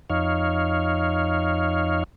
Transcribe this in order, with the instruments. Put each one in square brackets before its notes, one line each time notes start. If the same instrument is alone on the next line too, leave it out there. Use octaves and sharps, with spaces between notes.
[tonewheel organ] F2 D#4 C#5 F5